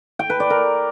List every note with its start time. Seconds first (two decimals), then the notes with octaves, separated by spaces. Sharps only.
0.19 G5
0.30 B4
0.40 D5
0.50 A#4